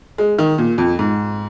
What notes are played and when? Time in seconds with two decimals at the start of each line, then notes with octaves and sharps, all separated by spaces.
0.18 G#3
0.39 D#3
0.58 A#2
0.78 F2
0.99 G#2